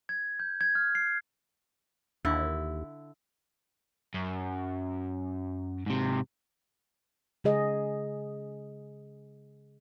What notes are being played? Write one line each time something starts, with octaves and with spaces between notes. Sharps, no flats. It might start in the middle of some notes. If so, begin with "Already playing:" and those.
G#6
G6
G#6
F6
C7
D#2 D3 E4
F#2
G#2 C3
C#3 G#3 G#4 D#5